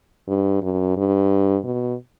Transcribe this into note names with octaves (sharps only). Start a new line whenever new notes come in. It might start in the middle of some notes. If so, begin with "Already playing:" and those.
G2
F#2
G2
B2